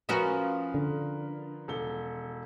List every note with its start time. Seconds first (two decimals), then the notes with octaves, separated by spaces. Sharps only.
0.09 F3 C#4 F#4 A#4 B4 D#6
0.74 D3
1.68 E1 A4 G7